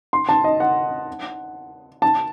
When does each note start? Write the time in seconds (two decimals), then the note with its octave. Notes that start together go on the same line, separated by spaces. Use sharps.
0.13 C6
0.29 A5
0.44 D#5
0.60 F#5
2.02 A5